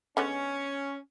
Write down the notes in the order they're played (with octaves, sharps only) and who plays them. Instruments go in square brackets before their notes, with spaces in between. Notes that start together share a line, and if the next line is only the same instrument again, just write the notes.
[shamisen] D3 G#3 B3 [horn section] C#4